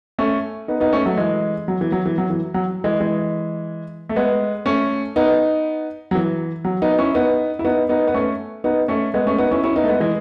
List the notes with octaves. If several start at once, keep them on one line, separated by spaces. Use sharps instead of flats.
A3 C#4
B3 D#4
B3 D#4
A3 C#4
F#3 A3
E3 G#3
F#3
E3
F#3
E3
F#3
E3
F#3
E3 G#3
E3 G#3
A3
G#3 B3
A3 C#4
B3 D#4
F#3
E3
F#3
B3 D#4
C#4 E4
B3 D#4
E4
B3 D#4
B3 D#4
B3
A3 C#4
B3 D#4
A3 C#4
G#3 B3
A3 C#4
B3 D#4
C#4 E4
C#4 E4
B3 D#4
A3
G#3 B3
E3 G#3